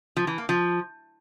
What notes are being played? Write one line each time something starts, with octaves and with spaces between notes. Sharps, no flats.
F3
E3
A#3
F3